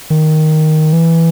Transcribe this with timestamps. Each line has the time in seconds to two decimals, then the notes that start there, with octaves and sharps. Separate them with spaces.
0.10 D#3
0.93 E3